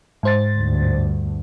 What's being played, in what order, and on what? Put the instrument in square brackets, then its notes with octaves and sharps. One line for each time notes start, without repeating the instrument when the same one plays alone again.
[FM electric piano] G#2 C5 A6
[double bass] D2 G2